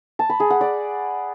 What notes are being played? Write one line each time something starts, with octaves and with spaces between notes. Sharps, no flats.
A5
B5
G#4
F#5
D5